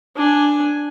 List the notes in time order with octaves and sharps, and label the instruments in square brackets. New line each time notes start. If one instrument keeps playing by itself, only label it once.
[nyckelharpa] D4 G#5